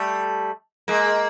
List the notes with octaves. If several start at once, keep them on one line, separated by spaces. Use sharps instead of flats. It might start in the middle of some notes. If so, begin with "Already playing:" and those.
Already playing: G3 A3
G#3 A#3